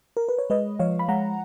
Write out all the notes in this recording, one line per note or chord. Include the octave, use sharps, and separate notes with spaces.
A#4
B4
C#5
G#3 B4 D#5
F3 C#5 F5
B5
G#3 F#5 A#5